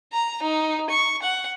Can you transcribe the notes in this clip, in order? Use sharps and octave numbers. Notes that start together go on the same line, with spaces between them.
A#5
D#4
C#6
F#5